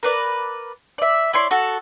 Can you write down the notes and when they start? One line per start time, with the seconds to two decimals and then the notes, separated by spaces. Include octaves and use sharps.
0.03 A#4 B4 D5
0.98 D5 E5
1.33 E4 C#5 D5 C6
1.51 F#4 A4